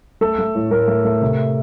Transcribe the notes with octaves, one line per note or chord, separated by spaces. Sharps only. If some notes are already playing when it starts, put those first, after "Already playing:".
A3 A4
A3
A2
A2 A#4
A3
A3
C3